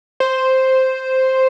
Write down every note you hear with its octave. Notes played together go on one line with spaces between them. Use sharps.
C5